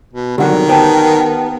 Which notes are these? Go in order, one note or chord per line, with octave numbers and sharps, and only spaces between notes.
B2
C2 D3 D#3 F#3 G4 F#5
B3 G4 C5 G5 A5